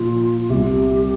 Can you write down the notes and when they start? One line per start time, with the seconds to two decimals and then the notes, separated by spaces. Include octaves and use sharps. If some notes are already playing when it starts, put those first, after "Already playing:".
Already playing: A#2 F3 F4
0.41 F4
0.50 C2 C3 G3 G4